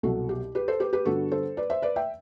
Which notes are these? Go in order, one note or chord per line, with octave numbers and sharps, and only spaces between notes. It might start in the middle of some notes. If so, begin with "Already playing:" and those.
C2 B2 F#3 F#4 A4
G4
G4 B4
A4 C5
G4 B4
G4 B4
G2 D3 G3 B3 F#4 A4
A4 C5
B4 D5
C5 E5
B4 D5
E5 G5